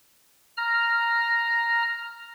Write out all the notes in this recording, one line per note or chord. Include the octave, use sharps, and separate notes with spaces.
A#5 F6